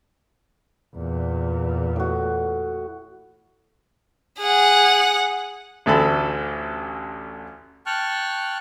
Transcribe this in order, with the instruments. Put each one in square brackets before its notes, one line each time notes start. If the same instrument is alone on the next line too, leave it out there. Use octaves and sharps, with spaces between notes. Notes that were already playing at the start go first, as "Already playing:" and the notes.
[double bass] E2 A#2
[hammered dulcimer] A2 F#4
[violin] G#4 F#5
[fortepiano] A1 D2 A4 B5
[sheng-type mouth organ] G5 A5 C#6 F6 F#6